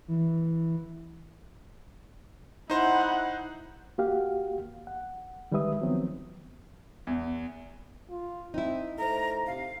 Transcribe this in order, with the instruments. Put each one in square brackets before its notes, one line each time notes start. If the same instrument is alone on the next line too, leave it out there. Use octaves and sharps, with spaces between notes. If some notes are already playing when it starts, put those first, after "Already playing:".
[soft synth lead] E3
[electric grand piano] D#4 C5 [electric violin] E4 F#5
[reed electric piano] A#3 F#4 G4 F5 F#5
F#5
D#3 G3 G#3 B4 E5 D#6
D#3 F3 F#3 B3 C4
[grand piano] E2
[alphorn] F4
[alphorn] C4 [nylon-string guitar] D#4 E4
[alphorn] A3 [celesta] A4 C5 [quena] A#5
[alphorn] C3 [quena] F5